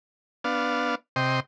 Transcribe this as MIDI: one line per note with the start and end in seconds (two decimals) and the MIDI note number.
0.44 0.95 59
0.44 0.95 62
0.44 0.95 77
1.16 1.40 48
1.16 1.40 75
1.16 1.40 79
1.16 1.40 84